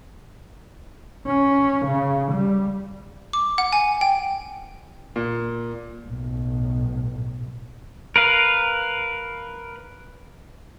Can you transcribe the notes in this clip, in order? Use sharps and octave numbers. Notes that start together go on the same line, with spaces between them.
C#4
C#3
G3
D6
F#5
G#5
G5
A#2
B1 A2
A#4 B4 F5